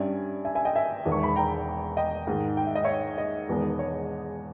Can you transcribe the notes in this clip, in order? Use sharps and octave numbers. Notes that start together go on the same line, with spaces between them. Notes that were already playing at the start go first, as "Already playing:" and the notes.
Already playing: G2 G3 C#4 E5 G#5
E5 G#5
E5 G#5
D#5 G5
E5 G#5
E1 E2 D#3 G#3
C#6
B5
G5 A#5
D#5 G5
G#2 D#3 G#3
G5
E5
D#5
C#5 E5
D#5
E1 E2 D#3 G#3 B3
C#5